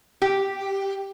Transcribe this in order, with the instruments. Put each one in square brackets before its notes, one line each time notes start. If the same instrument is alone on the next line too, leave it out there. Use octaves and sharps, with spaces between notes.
[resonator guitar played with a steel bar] G4